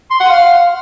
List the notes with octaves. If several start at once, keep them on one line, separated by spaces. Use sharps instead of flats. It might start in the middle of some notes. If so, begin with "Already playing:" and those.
C6
F#5
F5